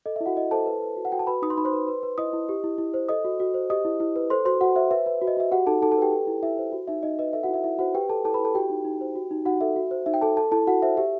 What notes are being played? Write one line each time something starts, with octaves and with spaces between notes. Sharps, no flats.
A4 D#5
E5
E4
F#4 F#5
E4 D#5
A4 C5 A5
B4
B4
F#4
F#5
F#4 G5
A5
F#4 B4 B5
D#4 D#6
C6
D#4 B5
C5 C6
B4
B4
B4
E4 D#5 D#6
E4
G4
E4
E4
C5
A4 D#5 D#6
F#4
F#4
C5
G4 D#5 D#6
E4
E4
B4
A4 C5 C6
F#4 C5 C6
F#4 F#5
C5 E5
B4 E5
B4
F#4
D#5
F#4 E5
F#4 G4 F#5
D#4 A4 A5
D#4 A4 A5
A4 A5
G4 B4 G5
A4
E4
E4 E5
C5
F#4
D#4 E5
D#4 D#5
B4 D#5
A4 E5
F#4 F#5
E4 E5
E4 E5
F#4 C5 F#5
G4 B4 G5
A4 B4 A5
E4 A4 A5
B4 B5
E4
A4 A5
F#4 G4 G5
D#4
D#4
C5
F#4
D#4
D#4 F#4 F#5
A4 E5
F#4
C5
D#4 E5
G5
A4 A5
A4 A5
E4 A4 A5
E4 F#4 F#5
C5 E5
G4 E5